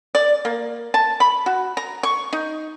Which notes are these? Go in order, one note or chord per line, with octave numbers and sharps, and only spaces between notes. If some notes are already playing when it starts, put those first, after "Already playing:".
D5
A#3
A5
B5
F#4
A#5
C#6
D#4